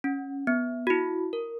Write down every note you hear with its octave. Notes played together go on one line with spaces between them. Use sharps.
C#4
B3
F#4
E4
A#4